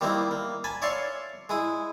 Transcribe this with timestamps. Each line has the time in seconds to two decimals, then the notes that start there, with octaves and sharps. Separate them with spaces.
0.01 D#3 G3 A#3 C4 D#4 E4
0.31 A#3
0.64 G#5 A5 B5
0.82 C#5 D5 E5 F5 C6 C#6
1.49 G#3 E4 D#6